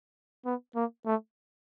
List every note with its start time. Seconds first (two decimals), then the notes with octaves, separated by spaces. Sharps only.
0.46 B3
0.76 A#3
1.06 A3